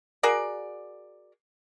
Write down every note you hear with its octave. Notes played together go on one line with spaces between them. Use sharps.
F#4 G#4 A#4 D5